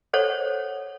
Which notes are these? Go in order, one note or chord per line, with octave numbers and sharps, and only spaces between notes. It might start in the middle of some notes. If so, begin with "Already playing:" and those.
A4 C5 C#5 F#5